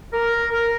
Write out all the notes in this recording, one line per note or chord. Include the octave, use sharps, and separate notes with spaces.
A#4
A#4